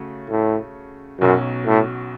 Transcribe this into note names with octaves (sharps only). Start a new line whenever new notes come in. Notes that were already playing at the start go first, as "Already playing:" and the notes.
Already playing: C#3 A3 F#4
A2
B1 F#2 B2 F#3 C#4
A2